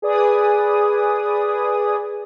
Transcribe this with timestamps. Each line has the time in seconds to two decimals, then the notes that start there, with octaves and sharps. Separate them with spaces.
0.02 G#4 B4 D5 G#5 D#6